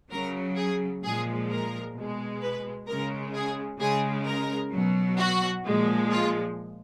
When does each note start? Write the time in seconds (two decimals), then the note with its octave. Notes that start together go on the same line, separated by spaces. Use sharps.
0.11 C#3 F#3 A#4
0.56 G#4
1.04 A#2 F3 G#3 G#4
1.50 A#4
1.95 B2 G#3
2.42 B4
2.87 C#3 G#3 A#4
3.34 G#4
3.80 C#3 G#3 G#4
4.26 A#4
4.73 B2 F#3
5.18 F#4
5.65 A#2 F3 G#3
6.11 F4